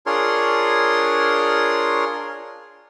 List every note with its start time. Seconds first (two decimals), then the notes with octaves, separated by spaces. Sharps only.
0.06 D4 F4 G#4 A#4 C#5 C6